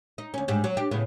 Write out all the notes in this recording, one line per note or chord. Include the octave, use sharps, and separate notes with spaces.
D#4
D2 C#4
G#2 G3
F#3
D4 G4
A2 C#3 B3